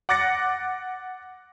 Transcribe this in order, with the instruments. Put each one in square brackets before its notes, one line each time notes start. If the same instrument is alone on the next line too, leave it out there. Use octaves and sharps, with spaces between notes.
[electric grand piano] F#5 D6 F#6 A6 A#6 C#7